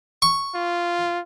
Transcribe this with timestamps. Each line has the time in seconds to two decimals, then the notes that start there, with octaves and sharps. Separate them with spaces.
0.22 C#6
0.54 F4